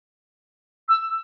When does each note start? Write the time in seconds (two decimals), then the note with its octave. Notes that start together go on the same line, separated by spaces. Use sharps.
0.89 E6